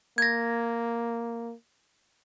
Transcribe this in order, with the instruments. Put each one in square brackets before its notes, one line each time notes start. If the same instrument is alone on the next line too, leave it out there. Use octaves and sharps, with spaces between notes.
[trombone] A#3 [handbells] G#6 A#6